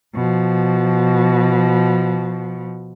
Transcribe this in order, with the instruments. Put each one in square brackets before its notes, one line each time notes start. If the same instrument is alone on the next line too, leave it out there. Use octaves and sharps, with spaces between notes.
[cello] B2 F3